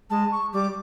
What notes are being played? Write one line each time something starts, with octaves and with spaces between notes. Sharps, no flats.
G#3 A5
C#6
G3 D6